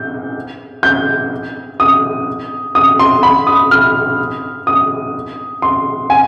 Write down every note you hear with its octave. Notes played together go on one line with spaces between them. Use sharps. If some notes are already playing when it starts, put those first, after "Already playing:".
Already playing: G6
G6
D#6
D#6
C6
B5
D#6
F6
D#6
C6
G#5